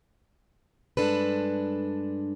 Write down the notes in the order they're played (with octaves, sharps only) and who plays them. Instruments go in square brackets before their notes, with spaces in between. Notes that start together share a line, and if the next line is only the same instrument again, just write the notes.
[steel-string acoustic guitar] G2 G#3 D4 A4 B4